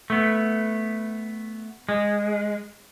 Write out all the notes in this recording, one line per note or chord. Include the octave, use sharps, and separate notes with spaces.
A3 B3
G#3